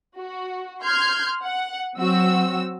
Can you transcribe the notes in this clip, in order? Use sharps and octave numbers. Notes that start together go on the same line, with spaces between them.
F#4
C6 F6 G6 G#6
F#5
F#3 C4 F#4 E6